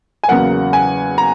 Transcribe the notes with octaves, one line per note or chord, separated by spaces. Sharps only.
G#5
E2 C#3 F#3 A#3 F#5
G#5
A#5